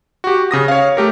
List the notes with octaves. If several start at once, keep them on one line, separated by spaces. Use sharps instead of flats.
F#4 G4
C#3 D#6 A#6
C#5 F5
A3 G4 A#4